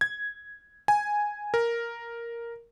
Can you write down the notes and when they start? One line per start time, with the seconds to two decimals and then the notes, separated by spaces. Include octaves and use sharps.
0.01 G#6
0.88 G#5
1.54 A#4